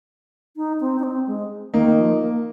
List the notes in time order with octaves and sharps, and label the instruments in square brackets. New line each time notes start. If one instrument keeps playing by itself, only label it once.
[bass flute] D#4
C4
D#4
C4
G#3
[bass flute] D#3 [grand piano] A#3 D#4
[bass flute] F3
A#3